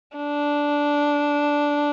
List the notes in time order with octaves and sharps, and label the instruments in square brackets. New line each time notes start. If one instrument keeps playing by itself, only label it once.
[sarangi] D4